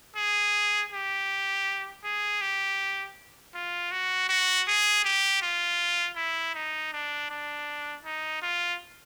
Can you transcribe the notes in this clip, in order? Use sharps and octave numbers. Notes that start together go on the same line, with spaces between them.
G#4
G4
G#4
G4
F4
F#4
F#4
G#4
G4
F4
E4
D#4
D4
D4
D#4
F4